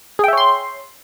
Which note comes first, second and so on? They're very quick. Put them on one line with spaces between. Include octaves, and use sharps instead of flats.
G#4 G5 E5 C#5 C6